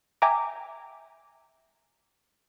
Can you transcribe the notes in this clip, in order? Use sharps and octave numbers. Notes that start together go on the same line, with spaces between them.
E5 G5 G#5 A#5 D6